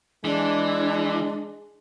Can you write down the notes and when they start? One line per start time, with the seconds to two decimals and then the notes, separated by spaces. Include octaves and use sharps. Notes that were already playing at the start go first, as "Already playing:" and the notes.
0.25 E3 G#3 D4